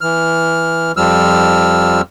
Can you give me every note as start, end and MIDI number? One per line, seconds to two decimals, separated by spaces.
0.01 0.92 52
0.01 0.92 89
0.97 2.01 41
0.97 2.01 53
0.97 2.01 55
0.97 2.01 88
0.97 2.01 89